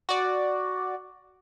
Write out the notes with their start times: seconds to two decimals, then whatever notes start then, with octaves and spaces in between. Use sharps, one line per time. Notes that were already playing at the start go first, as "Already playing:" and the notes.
0.09 F#4 D5